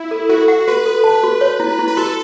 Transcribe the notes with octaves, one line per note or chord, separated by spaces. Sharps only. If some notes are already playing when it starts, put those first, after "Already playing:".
Already playing: E4
A4
F#4 A4
F#4 F#5
F#4 B4
A4
A5
F#4
C#5
E4
E4
B4
F#4 A4